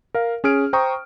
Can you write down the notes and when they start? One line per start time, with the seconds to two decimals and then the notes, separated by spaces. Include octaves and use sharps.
0.14 A#4 F5
0.44 C#4 G#4 F6 D7
0.73 C5 G5 A#5 C#6 D#6